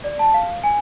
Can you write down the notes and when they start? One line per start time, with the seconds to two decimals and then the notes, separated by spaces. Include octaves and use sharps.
0.04 D5
0.19 A5
0.34 F5
0.64 G#5